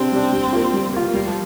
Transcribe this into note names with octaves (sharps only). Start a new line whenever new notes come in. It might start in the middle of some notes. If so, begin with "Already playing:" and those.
Already playing: C3 C4 D4
G3 D4
G3
A#3 F4
G3
A#3 F4
G3 A#3
F3